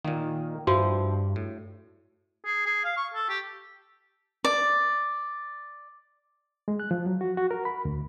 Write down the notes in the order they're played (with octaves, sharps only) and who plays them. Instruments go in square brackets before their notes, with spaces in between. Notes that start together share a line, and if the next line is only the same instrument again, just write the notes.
[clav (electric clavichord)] A#2 A#3 [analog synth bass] D#3
[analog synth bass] G2 [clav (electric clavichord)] F3 E4 C5 [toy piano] F#4
[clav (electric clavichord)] A2
[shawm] G#4
G#4
F5
C#6
A4
G4
[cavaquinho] D5
[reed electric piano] G#3
F#6
F3
F#3
F#4
F#4
A#4
B5
D2